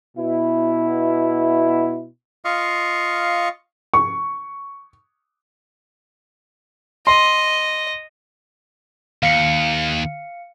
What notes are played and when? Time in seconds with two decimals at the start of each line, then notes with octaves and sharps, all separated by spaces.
0.17 B2 E4
2.45 F4 D#5 F5 C#6
3.94 C#6
7.07 D#5 C6
9.23 D#2 F5 C#7